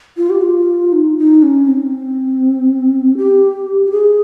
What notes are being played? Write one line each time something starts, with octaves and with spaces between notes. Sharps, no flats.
F4
G4
F4
D#4
D#4
C#4
C4
G4
G4
G#4